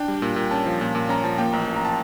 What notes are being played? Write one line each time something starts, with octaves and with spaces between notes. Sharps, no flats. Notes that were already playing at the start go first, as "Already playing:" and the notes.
Already playing: D4 G5
G3
A#2
A#2
C#4 A5
F3
A#2
A#2
C#4 A#5
F3 A5
A#3 G5
A1 A#5
F3
A#5
A5